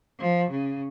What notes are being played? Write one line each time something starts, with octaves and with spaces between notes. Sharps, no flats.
F3
C#3